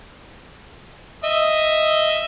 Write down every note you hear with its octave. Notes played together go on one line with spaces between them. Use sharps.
D#5 E5